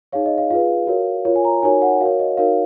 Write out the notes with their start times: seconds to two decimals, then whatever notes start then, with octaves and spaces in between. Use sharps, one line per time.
0.12 D#4 G#4 C#5 F5
0.26 D#5
0.38 F5
0.50 F4 G#4 B4 F5
0.87 F#4 A#4 C#5
1.25 F4 A#4 C#5
1.36 G#5
1.45 A#5
1.63 D#4 F#4 A#4 C#5 G#5
1.82 F#5
2.01 F#4 A#4 C#5 F5
2.19 D#5
2.37 D#4 F#4 A#4 C#5 F5